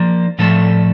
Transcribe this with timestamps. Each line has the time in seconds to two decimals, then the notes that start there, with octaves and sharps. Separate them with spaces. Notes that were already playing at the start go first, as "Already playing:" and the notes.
Already playing: F3 A#3 D4
0.38 A2 F3 A3 D4 A4